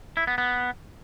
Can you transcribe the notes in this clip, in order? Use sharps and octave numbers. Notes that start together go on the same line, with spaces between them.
E4
B3
B3